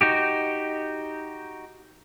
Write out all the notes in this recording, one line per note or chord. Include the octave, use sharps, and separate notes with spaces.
D#4 F#4 G4